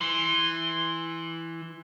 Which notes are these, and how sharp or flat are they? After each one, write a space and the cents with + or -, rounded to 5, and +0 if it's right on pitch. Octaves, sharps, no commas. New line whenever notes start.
E3 +0 C6 +0